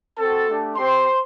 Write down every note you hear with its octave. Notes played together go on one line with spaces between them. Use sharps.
C4 F#4 A4 A5
A3 D4 G4
C4 G4 C5 C6